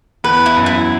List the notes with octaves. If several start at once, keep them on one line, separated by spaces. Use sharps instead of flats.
E2 B4
E4
F#2
E4